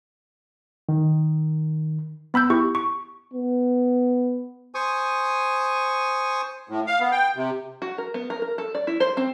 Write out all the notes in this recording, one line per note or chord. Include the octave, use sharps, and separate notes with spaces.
D#3
B3 B5 E6 G6
E4 G4 C#6
C#6
B3
C5 G#5 C#6 D#6
A2
F5
B3
G5
C3
F#4
A#4
B3
A#4
A#4
A4
D5
E4
C5
C4